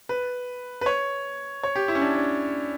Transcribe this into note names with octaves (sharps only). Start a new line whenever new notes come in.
B4
B4
C#5
C#5
G4
E4
C#4
D4
D4